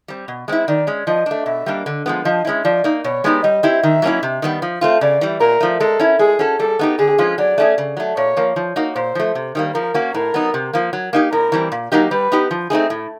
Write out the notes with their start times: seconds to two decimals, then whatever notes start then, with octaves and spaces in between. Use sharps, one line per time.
0.08 G3 C4
0.28 B2
0.48 G#3 C4 E4
0.68 D#3 D5
0.87 G#3 C#4
1.07 F3 D#5
1.26 A3 D4
1.46 B2 E5
1.66 G3 A#3 D4
1.86 D3
2.06 F3 G#3 B3
2.25 F3 D#5
2.45 G#3 C#4 E4
2.64 F3 D5
2.84 A#3 D#4
3.04 B2 C#5
3.24 G#3 B3 D#4 G4
3.43 G3 D#5
3.63 C4 E4 G4
3.83 D#3 E5
4.02 F#3 A#3 C#4 E4
4.23 C3
4.42 D#3 G3 B3
4.62 F3
4.81 A3 C4 F4
5.01 C#3 D5
5.21 E3 G3
5.41 A#2 A#4
5.60 F3 A3
5.80 G#3 A4
6.00 C#4 E4
6.19 G#3 G#4
6.39 C#4 F#4 A4
6.60 G3 A4
6.79 B3 D#4 G4
6.98 D3 G#4
7.18 F3 G#3 C#4 F4
7.38 F#3 D5
7.58 A3 C#4 F4 G#4
7.78 C#3
7.97 F#3 A3
8.17 A#2 C#5
8.37 F3 A#3
8.56 F3
8.76 A#3 D#4 F#4
8.95 A#2 C5
9.15 F3 A3
9.35 C3
9.55 D#3 G3 A#3
9.74 F3 A#4
9.94 A#3 C#4 F#4
10.14 A2 A#4
10.34 F#3 B3 D#4
10.54 C3
10.73 F3 A#3
10.93 F#3
11.13 A#3 D#4 G4
11.32 A2 A#4
11.52 E3 G3 C4
11.72 A#2
11.92 F#3 A#3 D#4 G4
12.11 G3 B4
12.32 B3 D#4 G4
12.51 F3
12.70 A3 C4 D#4 G#4
12.90 A2